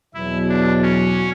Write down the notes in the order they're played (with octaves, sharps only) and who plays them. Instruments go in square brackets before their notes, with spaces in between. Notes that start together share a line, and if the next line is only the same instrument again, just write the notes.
[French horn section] E2 B2 F#3 [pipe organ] E4
[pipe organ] D4
C#4